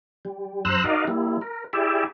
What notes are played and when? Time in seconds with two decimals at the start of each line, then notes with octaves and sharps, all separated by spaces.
0.25 G3
0.65 F#2 C5 A#5 E6 F#6
0.84 D#4 F#4 A#4 D5 D#5 F5
1.08 G3 A#3 E4
1.41 A#4
1.73 E4 G4 G#4 D5 E5